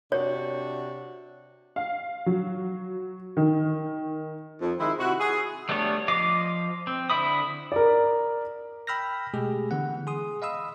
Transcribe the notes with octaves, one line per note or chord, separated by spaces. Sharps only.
C3 D4 F#4 C#5
F5
F#3
D#3
F2
D#3 G#3 E4
C3 E4 F#4
G#4
G3 A3 B3 D4 C#5
F3 D#5 F5 D6
C4
D3 E4 E5 B5 D#6
A#4 D5
G5 B5 E6 F6 G6 A#6
B2 G#3 A3 G4 G#4
D3 E3 B3 F#5
G#4 C6 D#6
D#5 F5 B5 D#6 E6